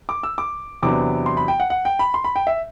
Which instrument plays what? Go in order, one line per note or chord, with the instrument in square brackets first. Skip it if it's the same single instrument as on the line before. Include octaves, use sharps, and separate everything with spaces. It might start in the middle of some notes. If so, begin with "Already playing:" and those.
[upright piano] D6
E6
D6
E2 C3 F#3 B3 D4 D6
C6
B5
G5
F#5
F#5
G5
B5
C6
B5
G5
E5